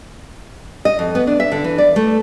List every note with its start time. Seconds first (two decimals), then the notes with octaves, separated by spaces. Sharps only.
0.85 D#5
0.99 F2
1.15 B3
1.27 D4
1.40 E5
1.52 D3
1.64 E3
1.78 D5
1.96 A3